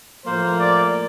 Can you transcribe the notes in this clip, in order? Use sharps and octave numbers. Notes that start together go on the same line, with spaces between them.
A2 F3 A#3 C5
D5